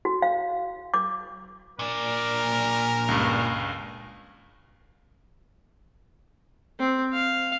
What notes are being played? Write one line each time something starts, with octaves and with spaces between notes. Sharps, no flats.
F#4
F5
D6
A#2 D4 A#4
C#2 G2
C4
F5